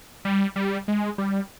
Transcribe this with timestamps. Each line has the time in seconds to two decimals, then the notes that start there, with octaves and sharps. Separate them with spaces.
0.25 G3
0.56 G3
0.88 G#3
1.18 G3